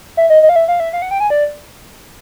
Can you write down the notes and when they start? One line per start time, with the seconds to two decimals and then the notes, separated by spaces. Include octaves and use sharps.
0.17 E5
0.30 D#5
0.43 D#5
0.49 F5
0.56 E5
0.68 F5
0.80 E5
0.93 F5
1.02 F#5
1.11 G5
1.20 G#5
1.30 D5